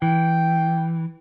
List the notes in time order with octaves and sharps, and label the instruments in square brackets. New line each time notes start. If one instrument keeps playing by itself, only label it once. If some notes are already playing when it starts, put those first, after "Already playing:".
[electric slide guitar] E3 [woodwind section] G5